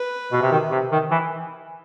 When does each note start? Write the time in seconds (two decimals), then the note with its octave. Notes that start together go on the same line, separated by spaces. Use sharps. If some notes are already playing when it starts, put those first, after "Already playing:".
Already playing: B4
0.32 B2
0.42 C3
0.51 D#3
0.72 C3
0.92 D#3
1.11 E3